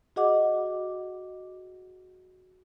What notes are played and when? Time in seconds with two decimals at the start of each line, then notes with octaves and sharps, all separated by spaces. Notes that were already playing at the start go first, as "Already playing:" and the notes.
0.16 F#4 G#4 D#5 F#5 D6